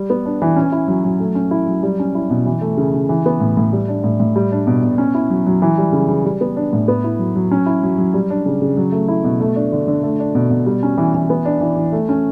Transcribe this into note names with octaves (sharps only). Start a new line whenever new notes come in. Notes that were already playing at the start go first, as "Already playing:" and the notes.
Already playing: G3
B3
D4
E3
C#4
E4
F#3
F#3
A3
C#4
E4
F#3
G3
C#4
E4
B2
E3
A3
C#3
C#3
E3
B3
A2
A2
G3
D4
A2
A2
G3
D4
B2
B2
C#4
E4
F#3
F#3
E3
G3
C#3
C#3
G3
B3
D4
A2
B3
E4
F#3
F#3
C#4
E4
F#3
F#3
G3
D4
C#3
C#3
F#3
A3
E4
B2
A3
D4
D3
D3
A3
D4
B2
B2
G3
C#4
E3
E3
B3
D4
E3
E3
A3
C#4